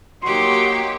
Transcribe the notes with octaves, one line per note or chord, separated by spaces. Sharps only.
F#3 A#3 D#4 F#4 G4 C6